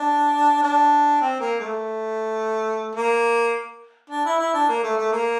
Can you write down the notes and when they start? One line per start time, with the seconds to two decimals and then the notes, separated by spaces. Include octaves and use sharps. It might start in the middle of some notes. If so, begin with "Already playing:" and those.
Already playing: D4
0.63 D4
1.21 C4
1.40 A#3
1.60 A3
2.95 A#3
4.10 D4
4.25 E4
4.39 E4
4.54 D4
4.69 A#3
4.83 A3
4.97 A3
5.12 A#3